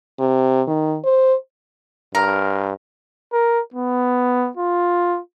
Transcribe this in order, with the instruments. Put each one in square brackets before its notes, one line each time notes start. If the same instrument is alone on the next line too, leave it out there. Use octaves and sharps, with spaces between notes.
[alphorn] C3
D#3
C5
[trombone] G2 [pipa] A#4
[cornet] A#4
B3
F4